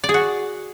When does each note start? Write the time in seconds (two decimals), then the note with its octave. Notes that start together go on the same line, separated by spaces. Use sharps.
0.04 D5
0.09 G#4
0.14 F#4